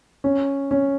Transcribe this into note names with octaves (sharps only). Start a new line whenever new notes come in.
C#4
C#4